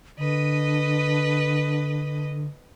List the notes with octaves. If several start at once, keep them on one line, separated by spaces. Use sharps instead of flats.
D3 B4 D#5